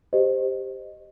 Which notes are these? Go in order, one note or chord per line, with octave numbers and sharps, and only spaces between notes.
G4 C5 D#5